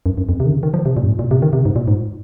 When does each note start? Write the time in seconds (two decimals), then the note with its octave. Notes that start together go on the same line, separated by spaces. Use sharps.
0.06 F#2
0.18 F#2
0.29 F2
0.40 C3
0.46 D#3
0.51 C#3
0.63 D#3
0.74 F3
0.85 C3
0.97 A#2
1.03 F#2
1.08 G#2
1.19 A#2
1.31 C3
1.42 D#3
1.53 C3
1.65 G#2
1.76 A#2
1.88 G#2